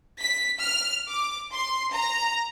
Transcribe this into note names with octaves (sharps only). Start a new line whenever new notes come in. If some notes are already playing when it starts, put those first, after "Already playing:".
B6
F6
D6
C6
A#5